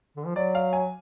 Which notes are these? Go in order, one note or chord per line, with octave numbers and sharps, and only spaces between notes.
D3
F3
F#3 D5
F5
G#5